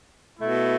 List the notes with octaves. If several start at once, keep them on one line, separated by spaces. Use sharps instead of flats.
B2 A3 E4